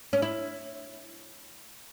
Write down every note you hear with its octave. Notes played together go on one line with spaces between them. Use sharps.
C#4
E4